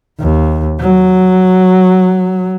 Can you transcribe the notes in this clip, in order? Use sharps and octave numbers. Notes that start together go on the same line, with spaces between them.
D#2
F#3